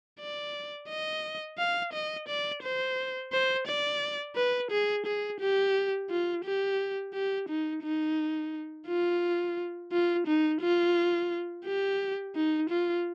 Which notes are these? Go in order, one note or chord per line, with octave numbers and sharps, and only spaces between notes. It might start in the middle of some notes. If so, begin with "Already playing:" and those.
D5
D#5
F5
D#5
D5
C5
C5
D5
B4
G#4
G#4
G4
F4
G4
G4
D#4
D#4
F4
F4
D#4
F4
G4
D#4
F4